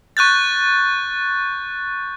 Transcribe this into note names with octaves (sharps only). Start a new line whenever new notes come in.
C#6 F#6 G6 A6